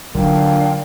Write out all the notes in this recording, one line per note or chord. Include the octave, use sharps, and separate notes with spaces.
A#2 D3 F#3 D4 D#4 F5 G5